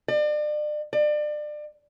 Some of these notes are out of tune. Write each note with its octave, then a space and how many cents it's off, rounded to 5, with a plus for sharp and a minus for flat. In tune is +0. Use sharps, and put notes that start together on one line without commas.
D5 +35
D5 +30